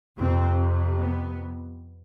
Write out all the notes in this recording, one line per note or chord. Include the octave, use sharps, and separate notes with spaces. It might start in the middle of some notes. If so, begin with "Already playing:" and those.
F2 C3 C4
B3